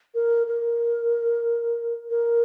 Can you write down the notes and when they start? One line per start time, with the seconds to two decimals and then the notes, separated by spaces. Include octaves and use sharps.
0.15 A#4
0.47 A#4
2.10 A#4